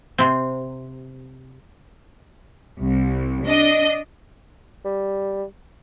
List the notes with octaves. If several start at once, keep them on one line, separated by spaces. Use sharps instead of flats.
C3 C4
C2
D4 D#5
G3